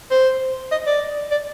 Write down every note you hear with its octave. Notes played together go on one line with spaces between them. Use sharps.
C5
D#5
D5
D5